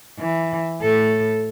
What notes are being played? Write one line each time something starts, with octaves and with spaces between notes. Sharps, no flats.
E3
A2 A4